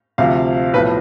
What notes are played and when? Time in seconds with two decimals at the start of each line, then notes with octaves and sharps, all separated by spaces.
0.18 D2 C3 F3 F5
0.74 B1 A2 F3 B4